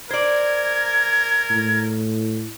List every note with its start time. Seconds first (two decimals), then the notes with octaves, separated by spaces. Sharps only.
0.10 A#4 C5 D5 G#6
1.51 A2